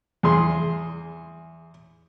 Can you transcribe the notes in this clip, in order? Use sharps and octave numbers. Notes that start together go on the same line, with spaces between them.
E2 G#4 C6